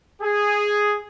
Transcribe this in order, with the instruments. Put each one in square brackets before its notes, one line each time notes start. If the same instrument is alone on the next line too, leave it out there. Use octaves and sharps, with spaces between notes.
[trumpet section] G#4